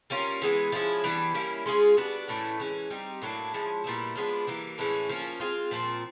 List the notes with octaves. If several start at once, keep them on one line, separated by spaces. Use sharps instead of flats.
G3 A#3 C#4 F4
E3 G#3 B3
F3 G#3 C#4 E4
E3 G3 B3 D4
G3 A#3 C#4 E4
G#3 C#4 F4 G#4
G3 B3 D4 F#4
A2 E3 A3 C#4
E3 G#3 C#4
G3 C4 D#4 G4
A2 F#3 A#3 D4
F3 G#3 C#4 E4
A#2 G3 B3 E4
F3 G#3 B3 D4
E3 G3 A#3
A2 E3 G#3 C#4
F3 A#3 C#4
G#3 C4 F4
A#2 F3 A3 C4